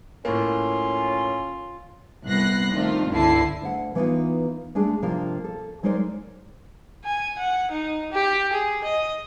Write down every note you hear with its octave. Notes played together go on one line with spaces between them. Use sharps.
A2 A#3 C#4 F4
C2 B3 F#6 A#6 C7
D#3 A3 C4 D4 F4
G1 C#2 D3 E4 A5 C7
D2 F#5
E3 A#3 B3 C#4 D#4 F4
G#3 A3 D4 G#4
C3 F3 A#3 D4 F4 A#4
A4
F#3 G#3 D#4 A#4 C5 D5
G#5
F#5
D#4
G4
G#4
D#5